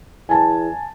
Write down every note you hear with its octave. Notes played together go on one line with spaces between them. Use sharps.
E2 G#5 A5